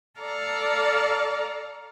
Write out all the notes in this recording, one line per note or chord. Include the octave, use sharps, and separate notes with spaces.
A4 D5 F5 A5 A#5